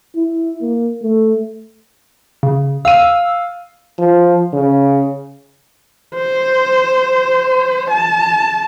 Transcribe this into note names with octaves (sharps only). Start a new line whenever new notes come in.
E4
A#3
A3
C#3
F5 E6 D#7
F3
C#3
C5
A5